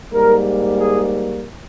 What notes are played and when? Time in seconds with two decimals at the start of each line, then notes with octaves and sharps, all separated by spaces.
0.13 G#2 G3 A#3 A#4
0.79 G#4